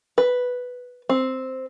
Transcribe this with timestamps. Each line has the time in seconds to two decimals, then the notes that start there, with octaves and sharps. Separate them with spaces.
0.18 B4
1.09 C4